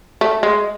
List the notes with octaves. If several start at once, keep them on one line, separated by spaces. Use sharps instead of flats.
A3
G#3